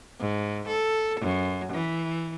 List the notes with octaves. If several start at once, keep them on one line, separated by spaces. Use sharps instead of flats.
G#2
A4
F#2
E3